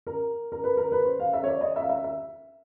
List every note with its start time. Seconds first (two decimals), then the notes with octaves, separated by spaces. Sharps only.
0.07 A#4
0.52 A#4
0.64 B4
0.77 A#4
0.92 B4
1.05 C5
1.20 F5
1.33 E5
1.44 C#5
1.48 D5
1.61 D#5
1.76 E5
1.82 F5
1.89 E5
2.04 E5